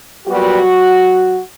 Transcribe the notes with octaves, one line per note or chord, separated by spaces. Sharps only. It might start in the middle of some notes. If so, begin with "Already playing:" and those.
A#2 F#3 G3 B3 F#4